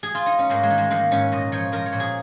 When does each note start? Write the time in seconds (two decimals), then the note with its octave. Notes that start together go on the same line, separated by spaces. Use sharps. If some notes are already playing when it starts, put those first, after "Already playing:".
0.03 G#4
0.14 F4
0.26 D#4
0.39 C#4
0.50 G#2 A#3
0.63 G#3
0.70 D#3
0.78 G#3
0.91 D#3 A#3
1.11 G#2 C#4
1.32 A#2 D#5
1.52 F3 C#5
1.72 F3 A#4
1.86 C#5
1.93 A#2
2.00 G#4